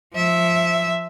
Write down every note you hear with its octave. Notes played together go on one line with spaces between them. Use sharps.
F3 E5